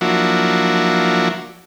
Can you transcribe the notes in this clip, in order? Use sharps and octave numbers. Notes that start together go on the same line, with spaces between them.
F3 F#3 A#3 D4 E4 F#4